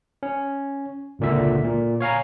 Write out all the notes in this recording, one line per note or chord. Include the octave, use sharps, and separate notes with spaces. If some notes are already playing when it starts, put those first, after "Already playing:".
C#4
G#1 C#2 A#2 D3 E5
A#2
C#5 F5 G#5 A#5